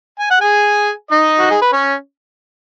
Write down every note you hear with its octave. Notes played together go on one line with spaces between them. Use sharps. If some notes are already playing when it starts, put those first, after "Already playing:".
G#5
F#5
G#4 G#5
D#4 D#5
F#4
G#4
B4
C#4 C#5